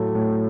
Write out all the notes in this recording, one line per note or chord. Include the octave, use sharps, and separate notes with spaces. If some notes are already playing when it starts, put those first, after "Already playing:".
Already playing: A2 F#3 A3
A2